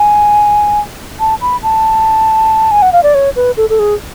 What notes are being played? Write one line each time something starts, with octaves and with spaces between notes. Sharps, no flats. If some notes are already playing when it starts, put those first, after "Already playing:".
Already playing: G#5
A5
B5
A5
G#5
F#5
F5
D5
C#5
B4
A4
A4
G#4